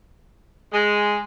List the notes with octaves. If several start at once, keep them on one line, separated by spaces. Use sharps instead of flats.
G#3